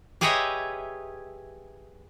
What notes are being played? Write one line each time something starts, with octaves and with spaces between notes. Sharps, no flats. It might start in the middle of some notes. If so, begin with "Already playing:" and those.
G4 G#4 B4 C#5 D#5 E5